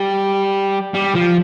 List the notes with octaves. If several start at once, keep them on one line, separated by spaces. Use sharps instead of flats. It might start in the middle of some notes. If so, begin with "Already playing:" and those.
Already playing: G3
G3
F3